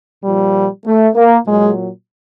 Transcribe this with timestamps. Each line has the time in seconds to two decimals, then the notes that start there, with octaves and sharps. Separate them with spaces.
0.23 A#2 F3 G3
0.85 A3
1.15 A#3
1.46 A#2 F#3 G#3